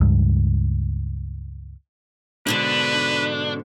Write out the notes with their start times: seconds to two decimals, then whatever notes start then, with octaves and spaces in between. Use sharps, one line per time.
0.01 C#2 G2
2.47 G#2 B2 D3 D4 B4